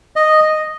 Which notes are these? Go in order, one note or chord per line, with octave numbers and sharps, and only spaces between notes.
D#5